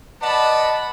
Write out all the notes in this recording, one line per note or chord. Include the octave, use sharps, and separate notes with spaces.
B4 D5 D#5 F#5 A5 B5